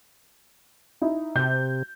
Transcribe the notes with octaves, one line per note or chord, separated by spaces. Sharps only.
D#4 E4
C3 G6